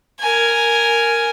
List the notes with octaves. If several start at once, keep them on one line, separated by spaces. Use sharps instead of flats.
A#4 G#5